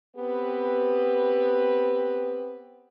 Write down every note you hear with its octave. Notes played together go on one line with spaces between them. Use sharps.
B3 C4 G4 B4